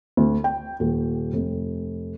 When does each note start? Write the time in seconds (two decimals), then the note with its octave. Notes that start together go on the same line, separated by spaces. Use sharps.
0.17 D2
0.44 G5
0.80 D#1
1.33 F1